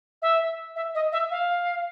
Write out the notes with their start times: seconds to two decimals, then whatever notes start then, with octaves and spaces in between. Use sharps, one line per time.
0.21 E5
0.75 E5
0.94 D#5
1.12 E5
1.30 F5